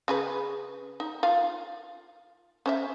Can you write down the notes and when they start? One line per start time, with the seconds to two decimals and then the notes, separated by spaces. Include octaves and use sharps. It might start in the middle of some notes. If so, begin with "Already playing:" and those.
0.08 C#3 G#4 B4
1.00 D#4
1.23 F4 F5
2.66 C#4 C5 E5